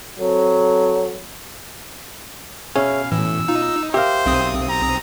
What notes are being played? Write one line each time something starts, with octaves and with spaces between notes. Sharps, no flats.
F#3 C4 A4
B2 C#4 G#4 C#5 E5 F5
A2 E3 E6
D#4 F4
G4 A#4 C5 E5 F5
B1 C4 D#6
A#5